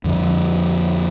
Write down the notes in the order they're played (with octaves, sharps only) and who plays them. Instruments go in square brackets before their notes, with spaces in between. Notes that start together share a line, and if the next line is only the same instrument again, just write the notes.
[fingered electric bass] F2 D3 F3